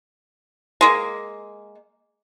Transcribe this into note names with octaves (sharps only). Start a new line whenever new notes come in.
G#3 A#3